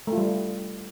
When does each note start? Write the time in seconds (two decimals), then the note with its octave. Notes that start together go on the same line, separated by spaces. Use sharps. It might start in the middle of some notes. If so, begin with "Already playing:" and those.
0.07 A3
0.12 F4
0.17 G3